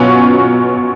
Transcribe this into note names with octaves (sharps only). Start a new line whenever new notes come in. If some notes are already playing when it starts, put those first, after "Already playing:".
Already playing: B2 F#3 B3 C#4 F4 F#4